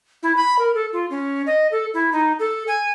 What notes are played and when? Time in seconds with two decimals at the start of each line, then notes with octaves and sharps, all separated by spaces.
0.23 E4
0.37 B5
0.59 A#4
0.75 A4
0.93 F4
1.10 C#4
1.47 D#5
1.71 A4
1.94 E4
2.12 D#4
2.39 A4
2.68 G#5